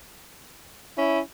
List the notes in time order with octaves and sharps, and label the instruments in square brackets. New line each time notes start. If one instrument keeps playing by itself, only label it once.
[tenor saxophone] C#4 [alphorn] E4